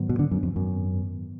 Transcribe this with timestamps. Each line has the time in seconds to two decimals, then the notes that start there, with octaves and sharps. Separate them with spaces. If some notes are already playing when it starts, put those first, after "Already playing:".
Already playing: G#2 D#3 F#3 B3
0.09 B2
0.19 D3
0.31 F#2
0.43 F2
0.56 F#2